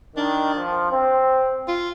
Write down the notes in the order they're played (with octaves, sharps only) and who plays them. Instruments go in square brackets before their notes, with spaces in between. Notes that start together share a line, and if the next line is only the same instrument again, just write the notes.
[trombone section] D#3 [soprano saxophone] D4
[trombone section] F3
C4
[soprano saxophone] F4